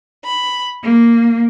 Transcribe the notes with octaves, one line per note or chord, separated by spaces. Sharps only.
B5
A#3